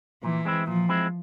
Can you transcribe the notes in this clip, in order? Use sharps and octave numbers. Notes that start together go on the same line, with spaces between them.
A#2 E3
G#3 C4 E4
A#2 F3
G#3 C4 E4